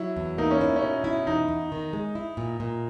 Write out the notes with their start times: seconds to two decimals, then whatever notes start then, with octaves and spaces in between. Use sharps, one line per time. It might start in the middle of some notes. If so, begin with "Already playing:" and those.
Already playing: F#3 E4
0.17 E2
0.38 A#3 D#4
0.51 C#4
0.61 E4
0.76 C#4
0.82 B2
1.04 E4
1.27 E2 D#4
1.48 E2
1.72 D#3
1.93 G#3
2.15 E4
2.37 A#2
2.60 A#2